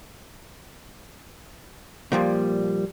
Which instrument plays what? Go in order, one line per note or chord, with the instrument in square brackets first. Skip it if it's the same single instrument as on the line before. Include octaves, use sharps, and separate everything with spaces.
[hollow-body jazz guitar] A#2 F3 G3 A#3